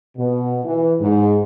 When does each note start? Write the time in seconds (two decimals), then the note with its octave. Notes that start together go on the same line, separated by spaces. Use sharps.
0.17 B2
0.64 E3
1.01 G#2